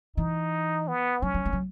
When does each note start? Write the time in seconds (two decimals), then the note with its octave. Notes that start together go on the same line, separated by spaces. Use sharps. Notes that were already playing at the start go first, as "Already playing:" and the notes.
0.17 E3 D#4
0.88 B3
1.22 F#3 C#4
1.34 F#3
1.45 G#3
1.53 F#3